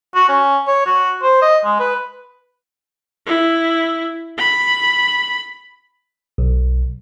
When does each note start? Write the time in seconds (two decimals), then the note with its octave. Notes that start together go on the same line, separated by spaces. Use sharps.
0.15 F#4
0.28 C#4
0.67 C#5
0.86 F#4
1.22 C5
1.42 D#5
1.64 G#3
1.79 B4
3.26 E4
4.38 B5
6.38 B1